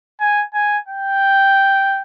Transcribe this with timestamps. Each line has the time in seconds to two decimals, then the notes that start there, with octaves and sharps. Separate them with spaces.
0.20 G#5
0.54 G#5
0.88 G5